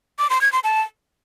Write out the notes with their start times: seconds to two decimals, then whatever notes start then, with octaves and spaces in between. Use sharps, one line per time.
0.19 D6
0.30 C6
0.41 G#6
0.53 C6
0.64 A5